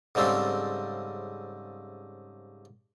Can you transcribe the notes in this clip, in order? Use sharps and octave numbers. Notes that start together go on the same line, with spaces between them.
G#2 C#3 G3 A3 C4